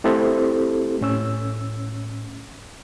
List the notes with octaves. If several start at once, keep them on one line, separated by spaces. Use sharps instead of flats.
A3 C4 E4 G4 A4 C5
A2 C#4 E6